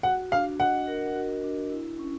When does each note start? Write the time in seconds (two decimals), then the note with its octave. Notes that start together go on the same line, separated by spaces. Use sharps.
0.03 F#4 F#5
0.31 D4 F5
0.60 D#5 F#5
0.87 A#4
1.16 F#4
1.44 D4
1.72 E4
1.99 C#4